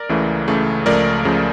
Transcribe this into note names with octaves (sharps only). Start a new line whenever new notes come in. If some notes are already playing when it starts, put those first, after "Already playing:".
Already playing: A#4 D5
C#2 C#3 E3 A3
C#2 C#3 E3 A3
C#2 C#3 F3 A3 A#4 D5
C#2 C#3 F3 A3